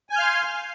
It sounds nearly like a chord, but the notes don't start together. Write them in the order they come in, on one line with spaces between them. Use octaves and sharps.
G#5 G6 F6 F5 C6